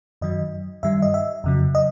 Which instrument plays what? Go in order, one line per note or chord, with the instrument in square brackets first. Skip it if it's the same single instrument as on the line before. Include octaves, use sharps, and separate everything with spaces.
[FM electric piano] F#2 D#3 F#3 D#5
G2 D#3 G3 E5
D#5
E5
F2 C#3 F#3
D#5